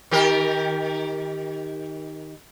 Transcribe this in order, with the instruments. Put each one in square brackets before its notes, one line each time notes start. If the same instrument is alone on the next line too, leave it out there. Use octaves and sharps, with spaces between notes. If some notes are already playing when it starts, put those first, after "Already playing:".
[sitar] D#3 G4 A#4